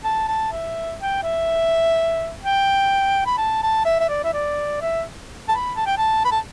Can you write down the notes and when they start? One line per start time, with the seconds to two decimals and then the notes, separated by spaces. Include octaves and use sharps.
0.04 A5
0.28 A5
0.52 E5
1.00 G5
1.23 E5
2.43 G5
3.26 B5
3.38 A5
3.63 A5
3.85 E5
4.00 E5
4.09 D5
4.24 E5
4.33 D5
4.82 E5
5.49 A5
5.52 B5
5.77 A5
5.86 G5
5.98 A5
6.25 B5
6.32 A5